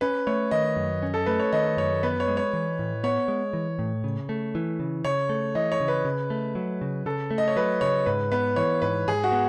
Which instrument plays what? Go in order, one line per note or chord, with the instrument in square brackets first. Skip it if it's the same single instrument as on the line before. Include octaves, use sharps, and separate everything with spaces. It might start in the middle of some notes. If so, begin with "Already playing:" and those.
[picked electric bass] C#4 [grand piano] B4
[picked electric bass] A3 [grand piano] C#5
[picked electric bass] D#3 [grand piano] D#5
[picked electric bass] F#2
C#4
[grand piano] A4
[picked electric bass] A3 [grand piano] B4
[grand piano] C#5
[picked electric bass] D#3 [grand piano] D#5
[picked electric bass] F#2 [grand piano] C#5
[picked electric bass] B3 [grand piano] B4
[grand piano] C#5
[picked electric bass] G#3
[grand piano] C#5
[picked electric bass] E3
A2
[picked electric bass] B3 [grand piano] C#5
[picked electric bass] G#3
E3
A2
C#3
A3
E3
C#3
[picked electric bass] C#3 [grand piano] C#5
[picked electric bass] A3
[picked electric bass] E3 [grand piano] D#5
[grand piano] C#5
[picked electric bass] C#3
[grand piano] B4
[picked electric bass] C#3
A3
F#3
C#3
[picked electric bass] C#3 [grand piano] A4
[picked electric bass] A3
[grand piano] D#5
C#5
[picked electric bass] F#3 [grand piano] B4
[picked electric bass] C#3 [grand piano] C#5
[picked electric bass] G#2 [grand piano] B4
[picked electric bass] B3 [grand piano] B4
[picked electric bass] E3 [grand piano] C#5
[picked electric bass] G#2 [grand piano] B4
[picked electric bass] G#2 [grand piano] G#4
[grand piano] F#4
[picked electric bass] B3